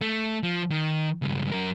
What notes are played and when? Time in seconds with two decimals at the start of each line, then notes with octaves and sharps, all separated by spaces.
0.01 A3
0.43 F3
0.71 D#3
1.22 C#2 G2
1.52 F#2 A#4